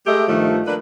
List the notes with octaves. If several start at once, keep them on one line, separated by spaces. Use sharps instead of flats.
G#3 A3 G4 D#5 E5
G2 D#3 F3 A3
A#3 D4 B4